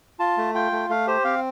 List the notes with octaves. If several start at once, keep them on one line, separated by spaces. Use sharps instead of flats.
F4 A5
A3
F4 G5
A3
A3 F5
G4 C5
C4 F5